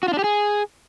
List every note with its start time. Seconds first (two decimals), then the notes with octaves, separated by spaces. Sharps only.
0.03 F#4
0.08 F4
0.13 D4
0.19 G4
0.24 G#4